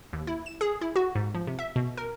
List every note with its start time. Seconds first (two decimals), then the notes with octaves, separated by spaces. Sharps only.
0.13 D#2
0.27 E4
0.46 E7
0.61 G#4
0.81 E4
0.96 F#4
1.15 G#2
1.34 F3
1.47 C3
1.59 E5
1.76 B2
1.97 A#4